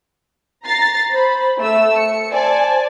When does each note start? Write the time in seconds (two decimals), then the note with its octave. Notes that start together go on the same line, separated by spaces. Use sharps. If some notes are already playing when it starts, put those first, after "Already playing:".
0.65 A#5 A6 C7
1.11 C5 B5
1.58 A3 E6
1.95 C#7
2.32 C5 D5 G#5 A5